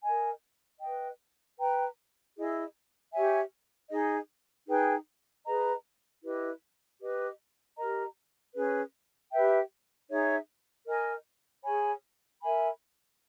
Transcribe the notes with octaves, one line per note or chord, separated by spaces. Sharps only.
A#4 D#5 G#5
B4 D#5 G5
B4 G5 A#5
E4 G#4 D#5
G4 C#5 E5 G#5
D#4 G#4 D#5
D#4 G#4 B4 G5
G#4 B4 D#5 A#5
E4 G4 B4 D#5
G4 B4 D#5
G4 A#4 D#5 A#5
C#4 G#4 B4
G4 B4 E5 G5
D#4 G#4 C#5 E5
A#4 D#5 G#5
G#4 C#5 G#5 B5
A#4 E5 G#5 B5